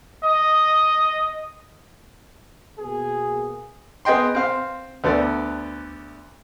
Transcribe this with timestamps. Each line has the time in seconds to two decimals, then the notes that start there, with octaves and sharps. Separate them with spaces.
0.24 D#5
2.80 B2 A#3 B3 G#4
4.05 B3 G#4 D#5 G5 C6
4.35 C4 F5
5.04 D2 B3 A4 D5